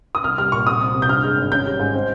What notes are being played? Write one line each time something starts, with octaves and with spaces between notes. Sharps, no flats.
D#6
C2 F6
G3 F6
A#2 C#6
C2 D#6
C3
C3
G6
G2 F6
G#3
G#1
C#4 G6
G3
G#2
C4